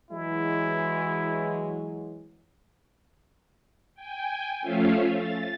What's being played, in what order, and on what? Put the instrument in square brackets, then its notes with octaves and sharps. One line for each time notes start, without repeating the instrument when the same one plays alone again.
[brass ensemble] E3 F#3 G#3 [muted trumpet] E4
[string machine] G5 G#5
F3 A3 C#4 F4 E5 F5
A6